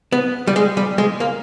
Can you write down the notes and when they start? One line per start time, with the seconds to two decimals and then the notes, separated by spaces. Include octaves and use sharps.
0.12 B3
0.47 G3
0.56 G#3
0.77 G3
0.98 G#3
1.20 A#3